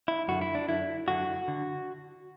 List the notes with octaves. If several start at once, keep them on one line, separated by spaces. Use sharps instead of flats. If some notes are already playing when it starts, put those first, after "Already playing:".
E4
F#2 D3 F#4
E4
D4
F#2 D3 E4
F#2 D3 F#4
D3